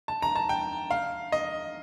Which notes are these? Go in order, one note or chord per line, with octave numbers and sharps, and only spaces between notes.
A5
A#5
A5
G5
F5
D#5